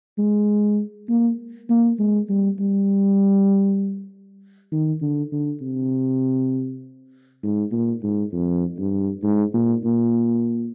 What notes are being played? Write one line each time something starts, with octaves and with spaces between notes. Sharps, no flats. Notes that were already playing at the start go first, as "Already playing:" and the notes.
G#3
A#3
A#3
G#3
G3
G3
D#3
D3
D3
C3
G#2
A#2
G#2
F2
G2
G#2
A#2
A#2